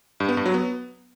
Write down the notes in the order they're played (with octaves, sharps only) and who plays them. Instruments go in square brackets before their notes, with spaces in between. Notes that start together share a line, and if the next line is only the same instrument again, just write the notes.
[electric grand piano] G2
B3
G2
F#3
B3